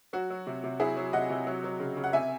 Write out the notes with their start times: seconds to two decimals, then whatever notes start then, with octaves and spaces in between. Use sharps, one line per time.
0.13 F#3 F#4
0.30 F#3
0.47 C3
0.64 C3
0.80 F#3 E4 G#4
0.97 F#3
1.13 C3 D#5 F#5
1.30 C3
1.47 F#3
1.64 F#3
1.80 C#3
1.97 C#3
2.04 F#5
2.13 C3 E5 G#5